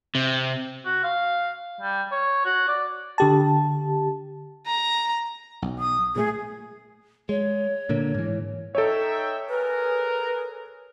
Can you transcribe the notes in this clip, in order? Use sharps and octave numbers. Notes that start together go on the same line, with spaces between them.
C3
F#4
F5
G3
C#5
F#4
D5
D3 G4 A5
A#5
B1
D#6
A#2 F#3 A3 G#4
G#3 C#5
A#2 D3 A#3
G#2 E3
D#4 A4 C#5 E5 G5
G#4 A#4 B4